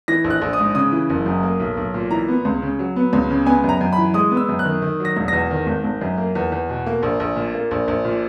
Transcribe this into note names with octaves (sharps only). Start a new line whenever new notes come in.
E3 A#6
A#1
F#6
A#1
D#6
G#2
C#3 D#6
E3
F#1
F#2
A#3
B1
B1
A#2
E3 A#5
B3
C#2
C#3
F#3
B3
C#2
C#3
B3 G#5
F#2 A#5
F#2
B5
E3
G#3 D#6
B3
E6
F#2
F#6
D#3
D#3
F#3 A#6
E1
E2 A#6
D#3
G#1
G#1
F#2
A#3
E2
E2
B2
A#3
A#1
A#1
A#2
A#3
A#1
A#1
A#2